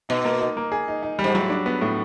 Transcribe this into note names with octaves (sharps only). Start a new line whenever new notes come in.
B2 D#4
A#3
D#4
A#3
G#4
D#4
D#4
G3
G#2
A2 F#3
D4
B3
A2